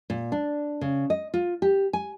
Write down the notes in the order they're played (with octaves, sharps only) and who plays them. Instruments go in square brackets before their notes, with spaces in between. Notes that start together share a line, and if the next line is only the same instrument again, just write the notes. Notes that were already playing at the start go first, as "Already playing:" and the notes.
[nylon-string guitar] A#2
D4
C#3
D#5
F4
G4
G#5